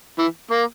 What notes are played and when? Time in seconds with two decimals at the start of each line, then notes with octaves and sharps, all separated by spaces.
0.18 E3
0.51 A#3